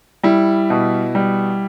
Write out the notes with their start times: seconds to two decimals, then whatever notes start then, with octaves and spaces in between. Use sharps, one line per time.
0.23 G3 E4
0.70 B2
1.15 G3